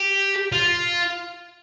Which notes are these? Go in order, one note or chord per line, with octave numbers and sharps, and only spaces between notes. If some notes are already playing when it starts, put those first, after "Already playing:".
Already playing: G4
F4